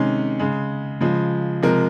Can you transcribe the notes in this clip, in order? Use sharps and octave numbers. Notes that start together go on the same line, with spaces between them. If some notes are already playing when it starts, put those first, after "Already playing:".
Already playing: C3 D#3 G#3 C#4
C#3 G#3
C#3 F3 G#3
C3 F3 G#3 A#4